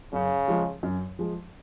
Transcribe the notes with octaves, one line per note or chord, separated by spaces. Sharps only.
F#2 C#3
F3 G#3
F#2
F3 G#3